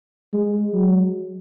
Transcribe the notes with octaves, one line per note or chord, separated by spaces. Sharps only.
G#3
F#3